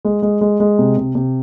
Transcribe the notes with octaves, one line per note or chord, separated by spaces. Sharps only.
G#3
G#3
G#3
G#3
C3
C3
C3